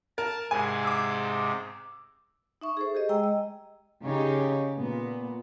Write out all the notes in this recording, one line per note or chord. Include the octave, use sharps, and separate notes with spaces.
A#4 A5
G#2 C3 G#3 G#5
D6 E6
D#4 E5 C#6
G#4 A4 C5
G4 G#4 D#5
G#3 G5 A#5 E6
D#5
C#3 D#4 G4 C#5
A#2 B3